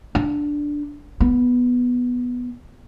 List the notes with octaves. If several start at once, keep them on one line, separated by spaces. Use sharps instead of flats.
D4
B3